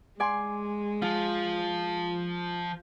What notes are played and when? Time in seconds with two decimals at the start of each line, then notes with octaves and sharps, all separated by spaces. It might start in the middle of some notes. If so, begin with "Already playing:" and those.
0.20 G#3 D5 G#5 C6
1.02 F3 F4